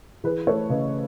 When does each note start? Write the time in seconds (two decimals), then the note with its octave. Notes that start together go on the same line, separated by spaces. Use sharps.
0.24 E3 G#4 B4
0.47 A3 A4 C#5
0.69 C#3 B4 D#5